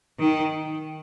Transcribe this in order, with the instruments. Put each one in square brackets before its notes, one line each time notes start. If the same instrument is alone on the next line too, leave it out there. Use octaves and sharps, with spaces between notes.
[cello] D#3